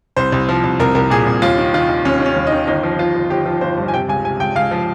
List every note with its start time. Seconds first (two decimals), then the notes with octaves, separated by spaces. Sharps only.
0.17 C2 C5
0.32 C2
0.49 F3
0.64 C2
0.80 C2 A#4
0.95 C2 A#4
1.10 A#2 G#4
1.26 C2
1.42 D#2 F4
1.58 D#3
1.74 D#3 F4
1.89 D#3
2.05 D#2 C#4
2.20 D#3
2.26 C#4
2.36 D#2
2.47 D#4
2.52 D#3
2.67 G1 D#4
2.83 F3
2.99 F3 F4
3.15 G1
3.30 G1 G4
3.46 F3
3.61 G1 C5
3.77 G2
3.88 G#5
3.94 C3 G5
4.09 C#2 G#5
4.24 C3 G#5
4.40 C#2 G5
4.55 C#2 F5
4.71 F3